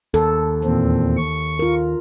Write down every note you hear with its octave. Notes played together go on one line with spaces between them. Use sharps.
D#2 A4
E2 A#2 C4
C#6
F4 A#4